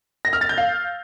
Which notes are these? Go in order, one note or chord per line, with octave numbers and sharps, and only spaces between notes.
A#6
F6
A6
G6
F5